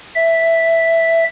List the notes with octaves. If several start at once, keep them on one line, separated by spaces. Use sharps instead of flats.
E5